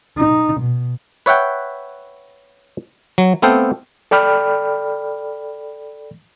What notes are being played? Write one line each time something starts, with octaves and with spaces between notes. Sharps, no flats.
D#4
B2
B4 C#5 E5 F#5 G5
F#3
A3 B3 C4 A4 F5 G5
A4 D5 G5 B5 F6